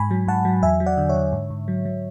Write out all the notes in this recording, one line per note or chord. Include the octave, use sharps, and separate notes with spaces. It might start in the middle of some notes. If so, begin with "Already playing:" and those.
Already playing: G#2 G#5 B5
F#3
G#2 F#5 A5
F#3
E2 E5 G#5
F#3
D5 F#5
D3
C#5 E5
D3
G#2
G#2
F#3
F#3